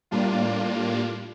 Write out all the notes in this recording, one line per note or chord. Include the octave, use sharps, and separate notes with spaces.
A2 G3 A#3 D4 F4